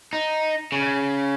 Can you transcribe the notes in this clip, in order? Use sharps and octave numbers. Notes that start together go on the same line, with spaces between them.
D#4
C#3